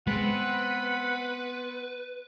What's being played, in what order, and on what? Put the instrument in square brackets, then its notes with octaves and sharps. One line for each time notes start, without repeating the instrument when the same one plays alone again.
[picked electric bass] G#3 [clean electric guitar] B3 C4 [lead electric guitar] B4 [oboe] F#5